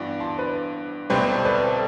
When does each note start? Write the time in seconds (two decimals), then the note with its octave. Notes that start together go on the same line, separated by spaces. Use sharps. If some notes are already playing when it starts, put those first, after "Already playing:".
Already playing: G2 E3 B3 D4 F#4
0.20 A5 C6
0.38 B4 D5
1.10 C2 B2 G3 C4 G4 B4
1.27 A4 C5
1.45 B4 D5
1.63 A4 C5